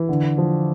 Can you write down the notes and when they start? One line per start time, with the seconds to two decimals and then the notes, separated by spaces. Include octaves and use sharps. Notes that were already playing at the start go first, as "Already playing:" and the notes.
Already playing: E3
0.09 D3
0.38 F3